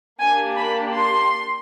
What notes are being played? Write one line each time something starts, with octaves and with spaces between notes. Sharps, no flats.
A#3 D4 G4 G#5
B5
C6